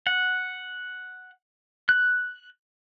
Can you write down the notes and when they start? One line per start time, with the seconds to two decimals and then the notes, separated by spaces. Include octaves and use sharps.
0.07 F#5
1.89 F#6